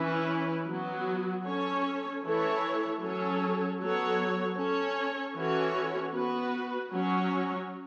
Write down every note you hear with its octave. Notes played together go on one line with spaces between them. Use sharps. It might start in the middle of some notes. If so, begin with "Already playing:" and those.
Already playing: E3 C#4 E4 B4
F#3 B3 F#4
C#4 A4 C#5
E3 A3 E4 A4 C#5
F#3 C#4 A4 C#5
F#3 B3 A4 C#5
C#4 A4 C#5
E3 C#4 F#4 A4 C#5
B3 F#4 B4
F#3 C#4 F#4 C#5